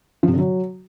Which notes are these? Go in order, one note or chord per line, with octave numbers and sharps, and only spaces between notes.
F3
C3
D3
F#3